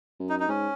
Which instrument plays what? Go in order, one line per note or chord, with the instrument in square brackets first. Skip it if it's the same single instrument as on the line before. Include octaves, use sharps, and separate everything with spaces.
[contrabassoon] F#2
[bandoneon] D#4
D#4
[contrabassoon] G#2 [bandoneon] C#4